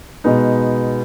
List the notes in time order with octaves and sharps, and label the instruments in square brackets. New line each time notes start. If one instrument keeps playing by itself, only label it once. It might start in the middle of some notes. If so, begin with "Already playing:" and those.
[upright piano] B2 G#3 B3 D#4